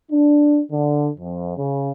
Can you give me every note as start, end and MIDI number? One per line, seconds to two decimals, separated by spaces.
0.11 0.60 62
0.72 1.09 50
1.18 1.54 41
1.57 1.91 49